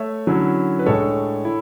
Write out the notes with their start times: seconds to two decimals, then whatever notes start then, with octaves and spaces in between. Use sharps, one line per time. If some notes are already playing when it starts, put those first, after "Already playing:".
Already playing: A3 C#5 E5
0.27 D3 F#3 C#4 E4
0.79 B4
0.86 A2 G#3 D4 A4 C#5
1.45 E4